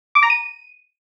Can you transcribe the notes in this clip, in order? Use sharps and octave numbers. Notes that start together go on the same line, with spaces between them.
D6
A#5
D#7